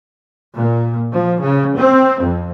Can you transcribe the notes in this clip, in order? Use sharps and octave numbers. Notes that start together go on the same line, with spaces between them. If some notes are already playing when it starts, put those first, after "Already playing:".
A#2
F3
C#3
C4
F2